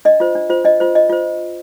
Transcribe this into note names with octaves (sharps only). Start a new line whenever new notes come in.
D4 D#5
F4 C5
D4
F4 C5
D4 D#5
F4 C5
D4 D#5
F4 C5